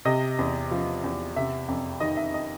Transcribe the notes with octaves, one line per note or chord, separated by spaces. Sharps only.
C3 D#5
E2
F3
E2
C3 E5
F2
D#3 D#5
E5
D#5